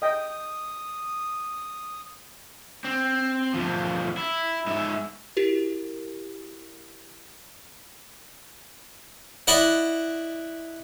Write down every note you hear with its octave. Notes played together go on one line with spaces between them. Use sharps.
D#5 G5 D#6
C4
D2 F3
E4
G#2 E5
E4 F#4 G4 A#4
E4 D5 D#5 F#5